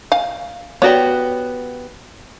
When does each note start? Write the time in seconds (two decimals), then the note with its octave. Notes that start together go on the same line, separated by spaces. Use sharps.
0.12 F5 G#5
0.82 B3 F#4 G4 C#5 D5